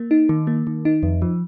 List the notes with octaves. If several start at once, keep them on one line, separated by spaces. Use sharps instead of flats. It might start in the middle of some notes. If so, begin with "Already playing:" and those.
Already playing: A#3
D#4
D#3
A#3
D#3
D#4
F2
F3